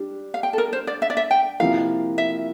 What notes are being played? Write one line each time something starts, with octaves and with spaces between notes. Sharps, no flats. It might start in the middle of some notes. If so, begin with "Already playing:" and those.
Already playing: G3 D4
F5
G5
A4
A#4
C5
D5
E5
D5
E5
G5
C3 F3 A#3 E4 A#4 F5
E5